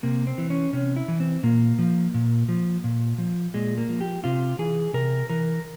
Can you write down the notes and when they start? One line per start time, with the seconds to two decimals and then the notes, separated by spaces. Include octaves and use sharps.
0.03 C3 A#3
0.27 C4
0.38 E3
0.50 C#4
0.73 C3 C#4
0.96 E4
1.08 E3
1.20 C4
1.43 A#2 A#3
1.79 F3
2.14 A#2
2.49 F3
2.84 A#2
3.18 F3
3.54 A#2 G#3
3.78 A#3
3.89 F3
4.01 G4
4.24 C3 F4
4.59 E3 G#4
4.94 C3 A#4
5.30 E3 A#4